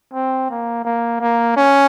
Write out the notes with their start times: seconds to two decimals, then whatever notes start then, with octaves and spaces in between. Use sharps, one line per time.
0.13 C4
0.50 A#3
0.85 A#3
1.21 A#3
1.56 C#4